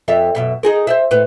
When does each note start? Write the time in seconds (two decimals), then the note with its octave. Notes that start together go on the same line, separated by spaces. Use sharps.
0.08 F2 A4 E5
0.35 F#2 B2 E5
0.63 D#4 G#4 A#4
0.87 C5 D5 E5
1.11 A2 B4